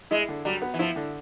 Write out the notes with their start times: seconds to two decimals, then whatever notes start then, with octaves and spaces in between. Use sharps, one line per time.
0.11 G#3 E4
0.29 D3
0.45 F#3 G3
0.62 B3
0.74 E3
0.79 F3 E4
0.96 D3